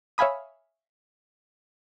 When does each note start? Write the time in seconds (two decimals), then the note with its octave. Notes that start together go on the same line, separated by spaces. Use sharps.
0.18 C#5 E5 F5 G#5 B5 D#6